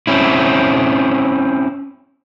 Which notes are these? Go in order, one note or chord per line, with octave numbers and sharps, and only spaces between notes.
C4 C#4 E4